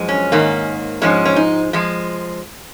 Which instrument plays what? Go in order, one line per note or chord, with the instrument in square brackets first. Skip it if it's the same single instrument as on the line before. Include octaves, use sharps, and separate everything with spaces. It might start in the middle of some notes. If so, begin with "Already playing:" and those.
Already playing: [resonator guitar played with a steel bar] F#2 F3 G#3
C#4
G#2 D#3 A#3
G#2 F3 G#3 C#4
C#4
D#4
F3 G#3